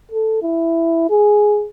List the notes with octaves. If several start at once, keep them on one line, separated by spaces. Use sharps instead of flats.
A4
E4
G#4